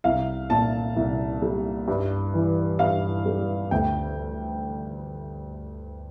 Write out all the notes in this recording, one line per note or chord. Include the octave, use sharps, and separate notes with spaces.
C2 F5
A#2 A5
C2
G3
G2
E3
G2 F5
G3
D2 G5